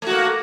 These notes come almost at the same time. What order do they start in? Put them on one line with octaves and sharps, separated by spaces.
A3 F#4 A#3